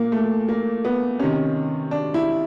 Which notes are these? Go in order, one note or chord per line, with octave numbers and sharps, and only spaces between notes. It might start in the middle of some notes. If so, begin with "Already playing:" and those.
Already playing: A#2 A#3
A3
A#3
B3
C3 D#3 C#4
D4
E4